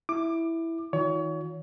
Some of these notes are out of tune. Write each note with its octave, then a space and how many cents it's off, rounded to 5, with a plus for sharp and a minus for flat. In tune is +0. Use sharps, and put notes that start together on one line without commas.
E4 +0 D6 +20
D#3 +35 F4 +40 C#5 +30